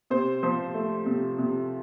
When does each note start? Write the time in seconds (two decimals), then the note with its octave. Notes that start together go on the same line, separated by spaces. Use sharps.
0.10 C3 C5
0.43 F3 C5
0.74 A3
1.06 C3
1.38 C3